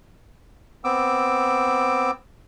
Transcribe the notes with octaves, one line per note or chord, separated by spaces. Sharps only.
B3 C4 D6 E6